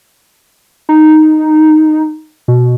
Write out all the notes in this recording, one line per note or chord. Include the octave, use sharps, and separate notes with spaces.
D#4
B2